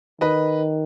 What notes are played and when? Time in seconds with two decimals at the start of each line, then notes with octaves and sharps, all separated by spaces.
0.21 D#3 B4 D#5